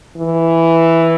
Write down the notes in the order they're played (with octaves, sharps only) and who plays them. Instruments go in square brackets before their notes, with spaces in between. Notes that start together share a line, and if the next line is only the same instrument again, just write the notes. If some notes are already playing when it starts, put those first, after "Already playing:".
[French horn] E3